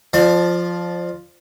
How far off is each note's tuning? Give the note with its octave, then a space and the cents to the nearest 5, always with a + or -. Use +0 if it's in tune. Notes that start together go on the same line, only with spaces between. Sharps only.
F3 +0 D5 +35